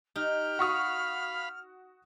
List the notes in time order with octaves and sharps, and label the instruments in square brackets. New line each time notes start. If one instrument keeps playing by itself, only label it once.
[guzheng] D#4 [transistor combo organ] G4 [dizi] F6
[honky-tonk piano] F#4 C#6 D#6 [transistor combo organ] F5 B5